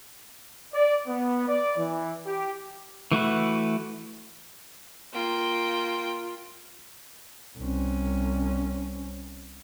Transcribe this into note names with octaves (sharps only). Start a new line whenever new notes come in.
D5
B3
D5
E3
G4
E3 A3 F#4 B4
A#3 F4 G5
C2 C#4